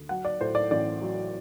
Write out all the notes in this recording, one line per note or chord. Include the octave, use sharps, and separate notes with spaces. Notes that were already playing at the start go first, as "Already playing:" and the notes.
Already playing: D2
F#3 F#5
D5
A2 C5
D5
A1 D5
F#3